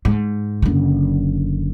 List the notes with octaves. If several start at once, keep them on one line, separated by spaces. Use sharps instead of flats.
G#2
F#1 D3